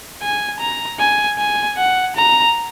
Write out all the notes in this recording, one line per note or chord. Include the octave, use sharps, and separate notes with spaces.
G#5
A#5
G#5
G#5
F#5
A#5